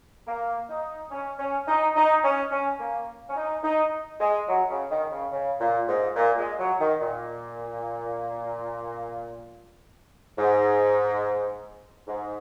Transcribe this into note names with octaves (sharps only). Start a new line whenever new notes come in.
A#3
D#4
C#4
C#4
D#4
D#4
C#4
C#4
A#3
C#4
D#4
D#4
G#3
F#3
C#3
D#3
C#3
C#3
A#2
G#2
A#2
G#3
F#3
D#3
A#2
G#2
G#2